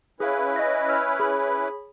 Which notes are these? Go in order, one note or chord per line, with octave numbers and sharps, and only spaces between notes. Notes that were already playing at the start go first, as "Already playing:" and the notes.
C#4 E4 G#4 B4 F5
D#5 A#6
E6 F6
G#4 C#5 B5